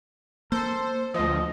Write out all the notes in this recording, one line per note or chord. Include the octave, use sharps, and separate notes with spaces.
A#3 A4 C5
D2 F3 D#5